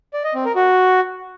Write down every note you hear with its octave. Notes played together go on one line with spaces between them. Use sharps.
D5
D#5
C4
A#4
F#4